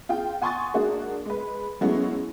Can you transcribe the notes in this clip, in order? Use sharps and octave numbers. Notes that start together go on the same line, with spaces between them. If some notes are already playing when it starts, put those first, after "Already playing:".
F4 G#4 G5
F#5 G#5 C6 C#6 D#6 A6
G#3 A#3 D4 F#4 G#4
G#3 B4
F#3 G#3 A3 B3 C#4 E4